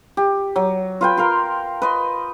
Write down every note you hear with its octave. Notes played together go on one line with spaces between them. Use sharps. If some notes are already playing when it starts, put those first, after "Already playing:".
G4
F#3
F4 B4 G5
A#4 F5 C6
B4 D#5 C6